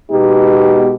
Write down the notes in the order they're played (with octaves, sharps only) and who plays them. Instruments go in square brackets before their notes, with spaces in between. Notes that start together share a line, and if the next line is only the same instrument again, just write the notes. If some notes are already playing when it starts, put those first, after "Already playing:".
[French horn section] B2 G#3 B3 D#4 G4